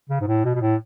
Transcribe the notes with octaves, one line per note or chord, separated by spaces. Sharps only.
C#3
G#2
A2
B2
B2
A2